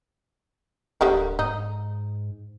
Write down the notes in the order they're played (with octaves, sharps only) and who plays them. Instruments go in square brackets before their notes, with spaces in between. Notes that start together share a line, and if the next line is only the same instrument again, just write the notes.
[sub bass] D1 [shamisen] D3 G3 A#4
[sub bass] G#2 [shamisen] D#4